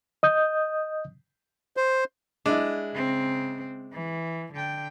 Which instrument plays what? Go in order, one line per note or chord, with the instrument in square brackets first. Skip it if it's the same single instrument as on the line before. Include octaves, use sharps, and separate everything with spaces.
[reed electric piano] D#5 D#6 G6
[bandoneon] C5
[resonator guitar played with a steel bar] G#3 [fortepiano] D4 E4
[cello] C#3 C4
E3
D3 G5